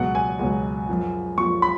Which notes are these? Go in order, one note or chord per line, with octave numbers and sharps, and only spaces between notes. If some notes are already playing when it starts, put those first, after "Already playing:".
Already playing: C#2 B2 F#3 F#5
G#5
C#2 B2 F#3
F#2 F3
F#2 F3 C#6
B5